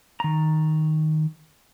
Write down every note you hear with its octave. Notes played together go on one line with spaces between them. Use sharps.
D#3 A#5